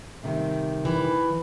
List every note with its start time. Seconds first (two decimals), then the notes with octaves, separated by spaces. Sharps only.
0.23 C3 D#3 G3
0.85 E3